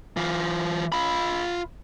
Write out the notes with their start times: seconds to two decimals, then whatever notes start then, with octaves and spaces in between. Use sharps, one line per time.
0.17 E3 F4
0.92 F4 B5